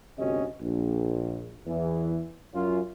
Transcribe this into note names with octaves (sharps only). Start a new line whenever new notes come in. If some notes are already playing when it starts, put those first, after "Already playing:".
G1 D2 C3 C#4 F#4 D#5
A#1
E2 E3
F#2 C#4 F4